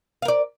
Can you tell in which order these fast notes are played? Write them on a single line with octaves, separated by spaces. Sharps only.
F5 A#4 D5